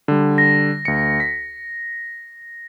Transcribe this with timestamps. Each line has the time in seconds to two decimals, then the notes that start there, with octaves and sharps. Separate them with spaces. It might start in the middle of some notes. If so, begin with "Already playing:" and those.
0.08 D3 G3
0.38 A#6
0.85 D2 C#7
1.20 B6